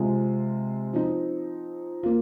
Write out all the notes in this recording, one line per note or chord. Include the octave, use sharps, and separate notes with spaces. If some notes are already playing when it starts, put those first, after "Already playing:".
Already playing: C3 G#3 F4
F3 C4 D#4
A#3 F4